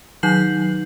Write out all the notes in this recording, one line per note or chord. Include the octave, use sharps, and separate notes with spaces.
D#3 F#3 D#4 G6 C7 F#7